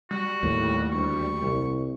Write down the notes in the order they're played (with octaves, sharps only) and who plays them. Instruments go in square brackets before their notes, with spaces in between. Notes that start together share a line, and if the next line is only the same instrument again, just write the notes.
[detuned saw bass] G3 [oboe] F#4
[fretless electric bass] D#2 [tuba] A2
[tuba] D2 [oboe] C#6
[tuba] C2